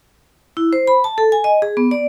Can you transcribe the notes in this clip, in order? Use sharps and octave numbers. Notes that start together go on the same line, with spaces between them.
E4
C5
B5
A5
A4
G#5
D#5
G#4
B3
D5